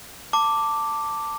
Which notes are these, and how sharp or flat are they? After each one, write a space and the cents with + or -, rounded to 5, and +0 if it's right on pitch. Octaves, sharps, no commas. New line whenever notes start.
A5 +20 D6 +0